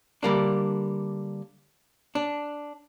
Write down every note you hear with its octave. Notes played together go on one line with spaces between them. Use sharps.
D3 G3 A#3 D4
D4